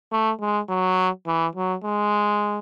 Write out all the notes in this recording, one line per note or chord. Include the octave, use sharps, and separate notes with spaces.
A3
G#3
F#3
E3
F#3
G#3